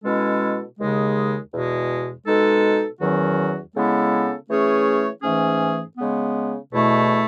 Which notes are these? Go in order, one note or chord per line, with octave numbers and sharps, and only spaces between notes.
B2 G#3 C#4 E4 A4
D#2 C#3 G#3
E2 B2 G#3
B2 G#3 D#4 A4
E2 D#3 F#3 C#4 F#4
C#3 G#3 B3 E4 A4
E3 A3 C#4 G#4 C#5
G#2 E3 A3 C#4 G#4
C#3 G#3 B3
E2 B2 A3 E4